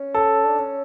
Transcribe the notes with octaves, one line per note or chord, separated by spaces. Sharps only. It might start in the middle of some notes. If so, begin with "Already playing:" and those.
Already playing: C#4
A4
D4
C#4